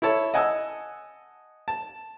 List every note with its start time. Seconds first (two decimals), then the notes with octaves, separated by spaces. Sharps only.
0.02 E4 A4 C#5 A5
0.34 D#5 F#5 G#5 A5 D#6 E6
1.68 A5